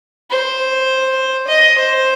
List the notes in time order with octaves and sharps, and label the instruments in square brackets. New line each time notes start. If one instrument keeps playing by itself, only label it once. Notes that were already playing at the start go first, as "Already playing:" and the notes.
[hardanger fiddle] C5
D#5
C5